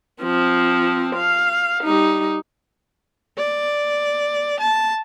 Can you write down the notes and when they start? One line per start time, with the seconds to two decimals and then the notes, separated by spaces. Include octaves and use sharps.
0.22 F3 C4
1.16 F5
1.84 G3 D#4
3.38 D5
4.60 A5